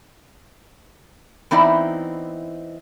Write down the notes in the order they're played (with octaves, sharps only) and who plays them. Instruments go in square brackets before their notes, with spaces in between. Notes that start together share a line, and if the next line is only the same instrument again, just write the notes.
[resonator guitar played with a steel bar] E3 B3 C4 D#4 E4 D5